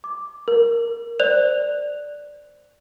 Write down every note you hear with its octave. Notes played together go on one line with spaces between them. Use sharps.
D6
A#4
C5 D5 F#6 F7